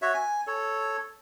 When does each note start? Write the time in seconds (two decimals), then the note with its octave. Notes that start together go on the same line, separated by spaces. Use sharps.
0.02 F#4 C#5 E5
0.14 G#5
0.47 A4 C#5